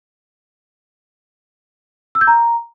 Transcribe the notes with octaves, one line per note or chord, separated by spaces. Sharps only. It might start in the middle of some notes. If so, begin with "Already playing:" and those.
E6
G6
A#5